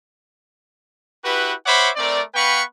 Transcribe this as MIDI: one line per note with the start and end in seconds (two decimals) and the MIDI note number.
1.24 1.53 64
1.24 1.53 66
1.24 1.53 67
1.24 1.53 71
1.66 1.90 72
1.66 1.90 73
1.66 1.90 76
1.66 1.90 78
1.66 1.90 83
1.66 1.90 86
1.96 2.22 57
1.96 2.22 60
1.96 2.22 70
1.96 2.22 74
2.35 2.62 59
2.35 2.62 71
2.35 2.62 77
2.35 2.62 79
2.35 2.62 83
2.35 2.62 85